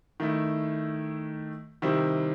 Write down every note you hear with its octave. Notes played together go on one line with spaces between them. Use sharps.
D#3 A3 E4
C3 D#3 G3 C4 E4